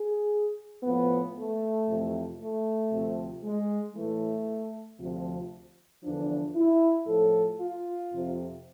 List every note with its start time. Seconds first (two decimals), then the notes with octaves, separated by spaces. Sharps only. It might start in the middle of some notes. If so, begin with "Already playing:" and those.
Already playing: G#4
0.83 A2 F3 B3
1.35 A3
1.87 F2 C3 E3
2.40 A3
2.91 D2 C3 F3
3.43 G#3
3.95 A2 E3 A3
4.99 D2 C3 F3
6.02 E2 D3 F3 D4
6.55 E4
7.06 A2 F3 A4
7.58 F4
8.10 F2 C3 F3